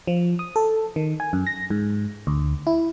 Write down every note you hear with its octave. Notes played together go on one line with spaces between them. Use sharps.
F3
D#6
A4
D#3
G#5
F#2
A#6
G#2
D2
E4